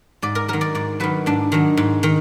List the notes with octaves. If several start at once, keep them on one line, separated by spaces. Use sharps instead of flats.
G#2 D5
A#4
D#3 F#3 A#4
D5
G#2 D5
D#3 F#3 B4
G#2 D4
D#3 F#3
G#2
D#3